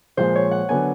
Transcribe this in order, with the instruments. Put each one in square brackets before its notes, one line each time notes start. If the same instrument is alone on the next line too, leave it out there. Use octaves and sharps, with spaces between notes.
[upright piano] A#2 F3 G#3 [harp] C5
[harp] C#5
F#5
[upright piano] D3 F#3 B3 D4 [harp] G#5